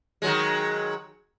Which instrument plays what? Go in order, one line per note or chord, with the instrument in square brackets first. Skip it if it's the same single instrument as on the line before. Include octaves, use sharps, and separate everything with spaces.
[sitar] D#3 F#3 G#3